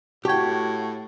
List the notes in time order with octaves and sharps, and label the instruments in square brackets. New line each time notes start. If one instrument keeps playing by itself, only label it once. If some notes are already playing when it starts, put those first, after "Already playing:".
[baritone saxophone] A2 [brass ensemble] F#4 [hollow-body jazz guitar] G4 G5 [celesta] A5 C#6 G#6